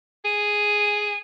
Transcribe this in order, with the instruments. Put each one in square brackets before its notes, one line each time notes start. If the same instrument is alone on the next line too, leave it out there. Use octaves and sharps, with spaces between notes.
[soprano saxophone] G#4 [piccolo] D#7